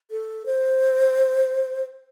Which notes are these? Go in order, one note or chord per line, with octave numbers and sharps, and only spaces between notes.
A4
C5